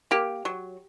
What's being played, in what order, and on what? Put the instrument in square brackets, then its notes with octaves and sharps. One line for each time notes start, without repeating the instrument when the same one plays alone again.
[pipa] A#3 G4
F#3